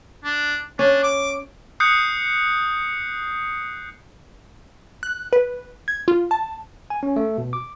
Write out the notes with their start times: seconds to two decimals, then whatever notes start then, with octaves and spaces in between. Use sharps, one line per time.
0.24 D4
0.79 C#4 D4
1.03 D6
1.80 D#6 F#6 G6 C7 C#7
5.03 F#6
5.33 B4
5.88 G#6
6.08 F4
6.31 A5
6.90 G#5
7.03 C#4
7.16 A3
7.38 B2
7.53 D6